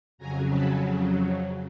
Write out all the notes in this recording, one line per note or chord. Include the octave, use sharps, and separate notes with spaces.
F2 C#3 F#3 G#5 A#5
A5 B5